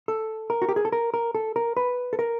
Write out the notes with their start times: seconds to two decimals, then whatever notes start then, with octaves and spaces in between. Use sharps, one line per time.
0.08 A4
0.50 A#4
0.62 F#4
0.69 G4
0.76 G#4
0.85 A4
0.92 A#4
1.14 A#4
1.35 A4
1.56 A#4
1.77 B4
2.13 A4
2.19 A#4